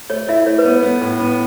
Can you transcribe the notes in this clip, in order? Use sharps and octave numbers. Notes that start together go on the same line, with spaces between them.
A3 C#5
E4 E5
A3 C#5
B4
B3 C#5
B3
A2
B3